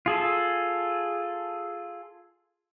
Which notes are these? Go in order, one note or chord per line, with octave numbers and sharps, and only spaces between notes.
F4 G#4 A4